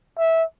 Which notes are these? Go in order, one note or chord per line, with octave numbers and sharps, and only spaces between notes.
E5